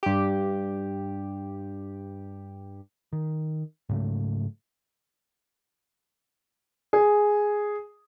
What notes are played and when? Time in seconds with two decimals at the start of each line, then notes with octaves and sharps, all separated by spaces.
0.03 G2 G4
3.13 D#3
3.89 G#2 C#3 F#3 A3
6.93 G#4